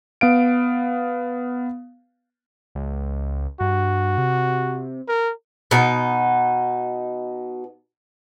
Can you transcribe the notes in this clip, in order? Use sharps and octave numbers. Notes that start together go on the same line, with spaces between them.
B3 F5 D7
C#2
G2 F#4
C3
A#4
B2 D#4